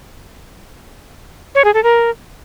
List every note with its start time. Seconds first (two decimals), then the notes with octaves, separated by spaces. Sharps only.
1.55 C#5
1.65 G#4
1.74 A4
1.83 A#4